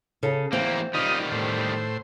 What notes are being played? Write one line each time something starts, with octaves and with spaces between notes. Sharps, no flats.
C#3 C#4 A4
E2 A#3 C4
D#3 G3 D#4 F4 D#5
A2 C5